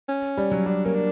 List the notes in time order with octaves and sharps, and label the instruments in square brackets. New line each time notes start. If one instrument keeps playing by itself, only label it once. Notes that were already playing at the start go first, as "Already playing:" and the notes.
[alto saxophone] C#4
[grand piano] G3
F#3
[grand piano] G3 [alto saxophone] D4
[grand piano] A#3 [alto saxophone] C#4
[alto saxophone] D4